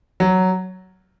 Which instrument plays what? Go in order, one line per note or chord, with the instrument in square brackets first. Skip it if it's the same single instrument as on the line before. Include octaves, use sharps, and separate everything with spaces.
[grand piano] F#3